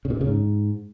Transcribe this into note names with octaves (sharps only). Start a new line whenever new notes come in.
C#3
A#2
C3
C#3
G#2